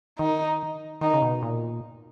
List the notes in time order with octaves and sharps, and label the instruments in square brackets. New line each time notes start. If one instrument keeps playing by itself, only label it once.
[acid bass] D#3 [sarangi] D#4
[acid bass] D#3 [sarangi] D#4
[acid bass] C#3
B2
A#2